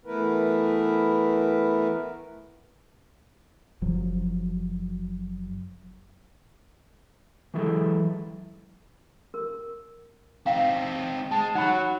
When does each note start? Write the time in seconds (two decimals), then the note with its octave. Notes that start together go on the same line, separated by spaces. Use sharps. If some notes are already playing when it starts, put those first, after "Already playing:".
0.06 E3 A3 B3 E4 A#4 B4
3.82 F#1 F3 F#3
7.54 E3 F#3 G#3 E4 G#4 A4
9.34 A#4
10.46 C4 D#4 F5 G5
11.31 G#3 A5
11.55 F#3 D#4 F#5 B5